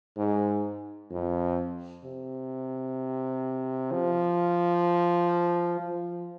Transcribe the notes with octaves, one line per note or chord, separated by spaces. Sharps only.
G#2
F2
C3
F3
F3